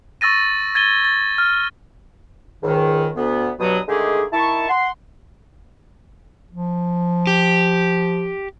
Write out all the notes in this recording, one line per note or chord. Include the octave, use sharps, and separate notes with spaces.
C#6 E6 A6 A#6 D#7
G#6 A6 D#7 G7
A6
F6
C#2 G#2 D#3
D2 B3
G2 B2 F#3 D#6
D3 D#3 G#3 A3 G4 G#4
D#3 E4 A5 C#6
F#5 C6
F3
G4